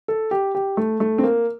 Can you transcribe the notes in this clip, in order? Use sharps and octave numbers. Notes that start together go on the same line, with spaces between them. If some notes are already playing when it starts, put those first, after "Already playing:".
A4
G4
G4
A3
A3
C4
A#3